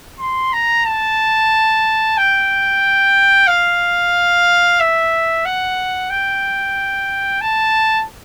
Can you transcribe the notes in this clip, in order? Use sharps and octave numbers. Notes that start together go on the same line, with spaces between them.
C6
A#5
A5
G5
F5
E5
F#5
G5
A5